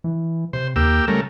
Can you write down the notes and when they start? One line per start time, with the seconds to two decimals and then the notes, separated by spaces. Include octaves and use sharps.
0.04 E3
0.53 C3 C5
0.76 D#2 A#3 G4 E6
1.08 C#3 G3 A3 A#4